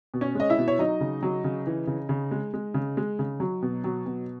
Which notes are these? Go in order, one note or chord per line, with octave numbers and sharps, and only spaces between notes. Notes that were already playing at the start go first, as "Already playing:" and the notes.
B2
C#4 C#5
G#3 D#5
E4 E5
B2
C#5
F#3 D#4 D#5
C#3
F#3
C#3
E3
C#3
C#3
G#3
G#3
C#3
G#3
C#3
F#3
B2
F#3
B2